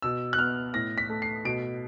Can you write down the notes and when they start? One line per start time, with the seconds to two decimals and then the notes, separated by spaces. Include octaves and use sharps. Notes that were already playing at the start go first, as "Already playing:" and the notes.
0.02 B2 E6
0.33 F#6
0.39 B3 F6
0.74 A2 A#6
0.98 B6
1.10 A3
1.22 C7
1.45 B2 D7